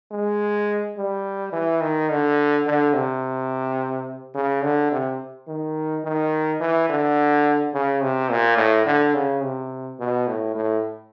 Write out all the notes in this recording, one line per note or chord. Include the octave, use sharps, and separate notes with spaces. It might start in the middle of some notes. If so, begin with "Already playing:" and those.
G#3
G3
E3
D#3
D3
D3
C3
C#3
D3
C3
D#3
D#3
E3
D3
C#3
C3
A#2
A2
D3
C#3
C3
B2
A2
A2